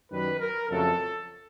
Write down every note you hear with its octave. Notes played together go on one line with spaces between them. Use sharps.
F#2 D#3 G3 B4
A#4
F2 C#3 F#3 A3 A4